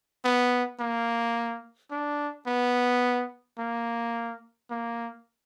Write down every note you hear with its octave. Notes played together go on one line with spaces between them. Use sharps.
B3
A#3
D4
B3
A#3
A#3